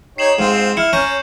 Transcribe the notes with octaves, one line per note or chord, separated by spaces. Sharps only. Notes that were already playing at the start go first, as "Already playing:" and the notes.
D#4 G4 C#5 C7 E7 F#7
G#2 C4 F4
E4 F6 C#7 E7
C#4 C#5 A#5 C#6 G6